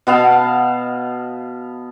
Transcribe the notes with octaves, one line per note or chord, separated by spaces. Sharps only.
B2 B3 F5 A5